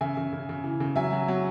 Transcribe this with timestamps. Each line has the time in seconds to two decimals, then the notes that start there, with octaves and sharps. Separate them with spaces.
0.01 C#3 E5 G#5
0.17 C#3
0.33 C#3
0.49 C#3
0.64 E3
0.80 C#3
0.96 F#3 E5 G#5
1.13 F#3
1.28 F#3